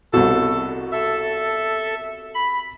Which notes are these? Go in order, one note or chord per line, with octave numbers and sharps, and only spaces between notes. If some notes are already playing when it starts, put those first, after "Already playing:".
C2 B2 A4
A4 E5
B5